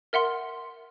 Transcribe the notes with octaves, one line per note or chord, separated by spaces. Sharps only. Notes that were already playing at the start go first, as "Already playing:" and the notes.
A#4 E5 F#5 C6